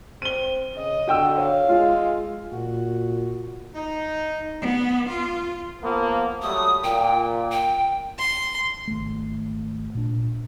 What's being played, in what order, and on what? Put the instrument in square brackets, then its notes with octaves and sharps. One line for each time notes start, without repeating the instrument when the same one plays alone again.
[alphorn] C4 [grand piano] D#7 G7
[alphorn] C#3 [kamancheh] D#5
[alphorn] D3 [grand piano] F#4 G5 E6
[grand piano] C#5 [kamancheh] F5
[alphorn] G#3 [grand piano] F4
[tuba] A#2 [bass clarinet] F#4
[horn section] D#4
[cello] B3
F4
[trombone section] F3 A#3 B3
[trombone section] F#3 G3 A3 [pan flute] D#6
[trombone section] A#2 [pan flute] G5
[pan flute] G5
[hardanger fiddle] C6
[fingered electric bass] G#1 A3
A#2 D4